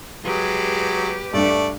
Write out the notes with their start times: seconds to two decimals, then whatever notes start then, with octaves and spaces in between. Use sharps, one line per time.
0.24 F#3 G#3 G4 B4
1.33 G2 A3 D4 D5